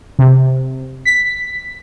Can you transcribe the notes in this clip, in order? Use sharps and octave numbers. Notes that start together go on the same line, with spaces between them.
C3
B6